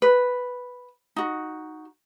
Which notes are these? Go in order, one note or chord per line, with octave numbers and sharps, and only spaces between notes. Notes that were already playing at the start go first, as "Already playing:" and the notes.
B4
D#4 F#4